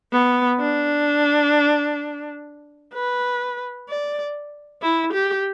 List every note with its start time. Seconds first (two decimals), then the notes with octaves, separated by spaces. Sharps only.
0.12 B3
0.60 D4
2.95 B4
3.89 D5
4.82 E4
5.13 G4